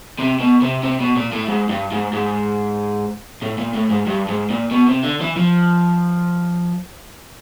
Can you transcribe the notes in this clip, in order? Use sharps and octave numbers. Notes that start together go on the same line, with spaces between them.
C3
B2
C3
C3
B2
A#2
A2
G#2
G2
G#2
G#2
A2
A#2
A2
G#2
G2
G#2
A#2
B2
C3
D3
E3
F3